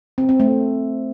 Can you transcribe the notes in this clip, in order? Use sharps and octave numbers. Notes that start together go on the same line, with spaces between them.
C4
C4
A3